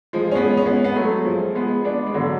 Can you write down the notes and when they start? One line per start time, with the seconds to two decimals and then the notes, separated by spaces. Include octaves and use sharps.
0.13 F3 G#3
0.31 C#4
0.35 G#3 B3
0.57 C#4
0.66 G#3 B3
0.84 B3
0.96 F#3 A3
1.25 F3 G#3
1.55 G#3 B3
1.84 B3 D4
2.06 G#3
2.14 D3 F#3